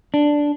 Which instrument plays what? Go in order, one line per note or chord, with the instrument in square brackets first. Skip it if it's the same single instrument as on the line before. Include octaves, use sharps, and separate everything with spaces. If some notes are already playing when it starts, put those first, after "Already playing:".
[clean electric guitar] D4